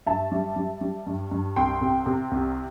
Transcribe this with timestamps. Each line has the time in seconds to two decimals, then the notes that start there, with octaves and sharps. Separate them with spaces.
0.06 G2 E5 A5
0.31 G3
0.56 G3
0.81 G3
1.07 G2
1.31 G2
1.56 C2 G5 C6
1.81 C3
2.06 C3
2.31 C2